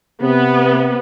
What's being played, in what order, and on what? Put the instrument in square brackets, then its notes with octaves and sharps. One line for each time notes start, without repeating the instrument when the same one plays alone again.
[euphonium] C3 [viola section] B3